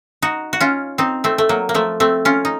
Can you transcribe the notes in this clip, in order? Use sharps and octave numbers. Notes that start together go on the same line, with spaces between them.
D#4 F#4
F#4
C#4 F4
C4 D#4
A3 C4
A3
F#3 A#3
A#3
F3 A3
A3 C4
C#4 F4
D#4